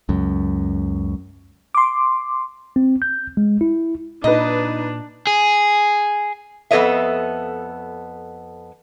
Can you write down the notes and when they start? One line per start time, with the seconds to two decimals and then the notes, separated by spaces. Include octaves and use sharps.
0.09 C#2 F#2
1.75 C6 D6
2.76 C4
3.02 G6
3.37 G#3
3.61 E4
4.24 A#2 D4 D#4 B4 D#5
5.27 G#4
6.71 F2 B3 A4 C#5 D#5 E5